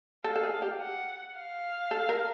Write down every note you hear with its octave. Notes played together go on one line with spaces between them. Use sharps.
A4 F5
A4
G#4
G4
F#5
F5
A4
A#4